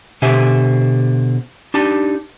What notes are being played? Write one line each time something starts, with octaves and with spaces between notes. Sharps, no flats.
B2 D3 G4 C5 E5 G#5
D4 D#4 G4 A5